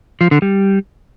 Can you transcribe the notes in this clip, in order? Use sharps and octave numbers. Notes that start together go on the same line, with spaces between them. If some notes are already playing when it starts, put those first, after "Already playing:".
F3
D3
G3